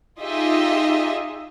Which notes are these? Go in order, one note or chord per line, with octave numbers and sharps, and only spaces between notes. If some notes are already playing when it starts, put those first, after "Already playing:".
D#4 F4 G4 G#4 D#5 E5